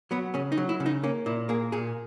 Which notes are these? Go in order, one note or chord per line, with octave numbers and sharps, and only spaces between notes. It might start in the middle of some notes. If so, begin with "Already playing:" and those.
F#3 B3
C#3 C#4
D#4
F#3
E4
C#3
D#4
A#3 C#4
A#2 E4
A#3 G#4
A#2 G#4